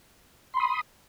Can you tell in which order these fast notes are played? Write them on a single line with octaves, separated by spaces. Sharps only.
C6 B5 D#6